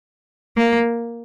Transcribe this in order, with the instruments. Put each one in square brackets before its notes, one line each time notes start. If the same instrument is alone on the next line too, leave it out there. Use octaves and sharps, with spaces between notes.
[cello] A#3